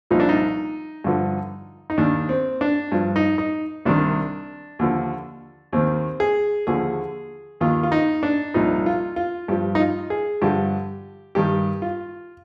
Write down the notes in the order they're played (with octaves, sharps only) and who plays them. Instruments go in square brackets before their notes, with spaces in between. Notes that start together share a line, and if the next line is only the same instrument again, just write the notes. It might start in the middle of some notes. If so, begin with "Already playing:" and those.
[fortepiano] C2 A#2 F3 D#4
D4
D#4
G2 D3 F3
D#4
D#2 D#3 D4
C4
D4
G2 F3
D#4
D#4
C2 C3 D#3 D4
D#2 D3 F3
D#2 D#3 C4
G#4
D#2 D3 F3 G#4
D#2 D#3 F4
F4
D#4
D4
C2 A#2 F3 D#4
F4
F4
G2 F3 G4
D#4
F4
G#4
G2 D3 F3 G4
G2 D#3 G4
F4